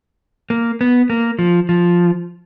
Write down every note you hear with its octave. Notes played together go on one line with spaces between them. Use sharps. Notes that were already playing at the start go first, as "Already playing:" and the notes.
A#3
B3
A#3
F3
F3